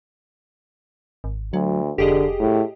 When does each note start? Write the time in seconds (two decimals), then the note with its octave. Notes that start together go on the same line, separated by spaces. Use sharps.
1.24 G#1
1.53 D2 F#3
1.98 F1 D3 G4 G#4 D#5
2.40 A2